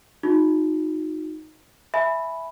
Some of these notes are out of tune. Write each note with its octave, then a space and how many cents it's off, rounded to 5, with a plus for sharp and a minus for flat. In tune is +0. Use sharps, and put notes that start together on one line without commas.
D#4 +0 F#4 -40
E5 +0 G#5 +15 B5 +0